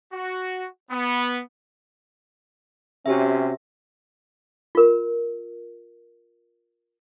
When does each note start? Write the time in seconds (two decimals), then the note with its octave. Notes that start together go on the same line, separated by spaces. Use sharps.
0.13 F#4
0.91 B3
3.06 C3 C#4 F#4 G4 E5
4.75 F4 A#4